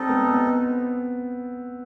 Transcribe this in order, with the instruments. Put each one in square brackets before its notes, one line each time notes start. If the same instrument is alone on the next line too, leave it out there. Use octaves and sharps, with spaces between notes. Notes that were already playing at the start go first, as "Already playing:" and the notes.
Already playing: [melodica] G3 D#4 A4 D#5 [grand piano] C4
[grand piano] B3
C4
B3